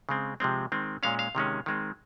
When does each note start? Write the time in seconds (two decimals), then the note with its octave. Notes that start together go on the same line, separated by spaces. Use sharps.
0.09 C#3 G#3 C4
0.40 C3 F3 G#3 C4
0.72 D#3 G#3 C4
1.03 A#2 G#3 C#4 F5
1.19 F5
1.35 C3 D#3 G#3 C#4
1.66 D#3 G#3 C4